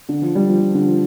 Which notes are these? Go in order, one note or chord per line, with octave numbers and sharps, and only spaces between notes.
D3
F3
G3
F3
F3
D3
F3